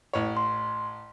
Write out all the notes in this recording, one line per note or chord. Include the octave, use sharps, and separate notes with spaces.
A1 C#5
C6